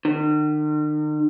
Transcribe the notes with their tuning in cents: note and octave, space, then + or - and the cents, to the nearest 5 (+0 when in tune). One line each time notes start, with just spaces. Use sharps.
D#3 -45